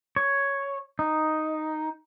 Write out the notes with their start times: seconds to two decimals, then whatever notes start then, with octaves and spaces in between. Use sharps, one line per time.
0.16 C#5
0.99 D#4